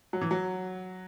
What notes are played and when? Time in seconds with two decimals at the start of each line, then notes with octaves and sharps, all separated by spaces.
0.13 F#3
0.21 E3
0.31 F#3